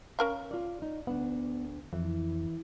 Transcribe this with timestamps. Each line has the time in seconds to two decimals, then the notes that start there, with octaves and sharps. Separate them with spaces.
0.19 C#4 A#4 F5
0.51 F4 D5
0.82 D#4
1.07 D2 B3 D4 F#5
1.93 F2 E3